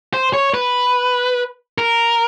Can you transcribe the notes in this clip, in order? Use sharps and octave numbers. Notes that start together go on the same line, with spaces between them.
C5
C#5
B4
A#4